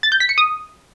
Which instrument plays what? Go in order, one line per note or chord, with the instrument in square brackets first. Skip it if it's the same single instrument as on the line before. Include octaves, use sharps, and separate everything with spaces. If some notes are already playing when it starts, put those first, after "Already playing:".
[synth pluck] A6
G6
B6
C#7
D#6